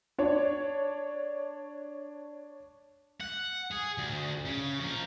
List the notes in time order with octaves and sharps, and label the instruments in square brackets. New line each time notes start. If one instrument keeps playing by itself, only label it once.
[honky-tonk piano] D4 C#5
[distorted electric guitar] F#5
G#4
D2
C#3
F3 A#4